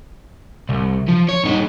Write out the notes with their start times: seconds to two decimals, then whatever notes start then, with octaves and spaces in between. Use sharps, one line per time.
0.69 C2
1.09 F3
1.29 C#5
1.44 A#2 D#4